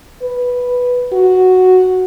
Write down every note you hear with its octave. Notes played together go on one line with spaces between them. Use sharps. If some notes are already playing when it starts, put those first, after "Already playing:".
B4
F#4